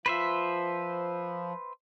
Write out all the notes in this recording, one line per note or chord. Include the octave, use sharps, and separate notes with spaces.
F3 B4 C5 E5